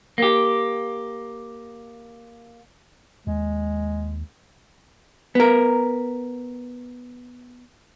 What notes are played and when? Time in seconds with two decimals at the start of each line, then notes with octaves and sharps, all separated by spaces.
0.18 A#3 G4
3.27 D#2 G#3
5.35 B3 A#4